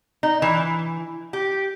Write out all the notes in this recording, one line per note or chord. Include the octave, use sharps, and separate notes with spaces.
D#4
E3
G4